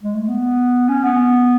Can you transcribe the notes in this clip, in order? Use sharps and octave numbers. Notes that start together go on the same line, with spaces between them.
G#3
A3
B3
C#4
B3